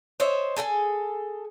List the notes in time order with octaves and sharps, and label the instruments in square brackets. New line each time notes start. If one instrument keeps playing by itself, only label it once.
[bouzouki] C5 C#5 D#5 E5
G#4 A4 E5 G#5